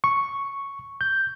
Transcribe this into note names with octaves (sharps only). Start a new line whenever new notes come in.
C#6
G6